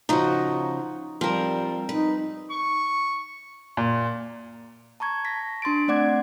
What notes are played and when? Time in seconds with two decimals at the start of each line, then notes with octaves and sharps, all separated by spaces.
0.09 C#3 F3 D#4 F#4
1.21 F3 G3 C4 A#4
1.89 D#4 B4
2.52 C#6
3.77 A#2
5.00 A5 A#5 C#6 G#6
5.25 A#6 B6
5.62 D4 C6 A6 D7
5.88 A3 C4 D5 F#5 D6 G#6